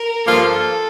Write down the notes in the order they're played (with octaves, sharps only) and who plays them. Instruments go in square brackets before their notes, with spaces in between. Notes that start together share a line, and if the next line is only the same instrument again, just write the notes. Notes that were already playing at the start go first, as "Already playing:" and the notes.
Already playing: [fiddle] A#4
[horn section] G2 F3 A#3 F4 [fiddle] A4